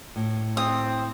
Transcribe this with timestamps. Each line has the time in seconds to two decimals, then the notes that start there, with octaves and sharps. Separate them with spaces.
0.16 A2
0.57 C4 D#6